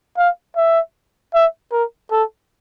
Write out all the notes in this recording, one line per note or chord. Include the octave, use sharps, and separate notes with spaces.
F5
E5
E5
A#4
A4